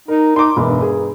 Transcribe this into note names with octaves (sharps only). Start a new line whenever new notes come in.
D#4 A#4
D#4 C6 D6
E1 G2
G#4